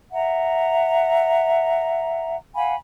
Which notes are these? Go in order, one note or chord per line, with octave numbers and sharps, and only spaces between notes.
E5 F#5 A#5
F5 F#5 G#5 B5